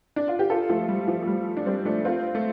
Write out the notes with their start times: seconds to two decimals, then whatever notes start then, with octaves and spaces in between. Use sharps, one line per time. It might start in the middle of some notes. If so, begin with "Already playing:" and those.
0.16 D4
0.28 F4
0.39 G4
0.50 F4 A4
0.69 F3 A3
0.89 G3
1.08 F3
1.22 A3
1.27 G3
1.57 D4
1.66 G3 C4
1.85 A3 D4
2.05 C4 F4
2.35 A3